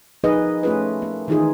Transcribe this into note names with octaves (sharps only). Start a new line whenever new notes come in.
F3 A#3 D#4 G#4 B4 D#5
A3 C#4 F4 G#4 B4
A#3
D#3 E3 D#4 F4 G#4